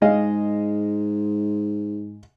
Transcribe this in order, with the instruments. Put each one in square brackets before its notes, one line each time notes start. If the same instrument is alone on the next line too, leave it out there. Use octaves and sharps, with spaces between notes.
[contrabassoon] G#2 [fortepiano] G#3 D#5 F5